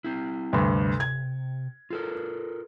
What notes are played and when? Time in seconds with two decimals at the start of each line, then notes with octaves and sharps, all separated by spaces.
0.04 C4 E4
0.53 D2 G2 C3
1.00 G#6
1.90 F4 A4 A#4